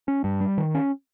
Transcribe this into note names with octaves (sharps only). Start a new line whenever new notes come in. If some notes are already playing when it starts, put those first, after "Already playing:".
C#4
G2
G3
D#3
C#4